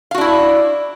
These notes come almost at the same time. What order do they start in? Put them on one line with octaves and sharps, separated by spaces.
F5 F#4 D4 E4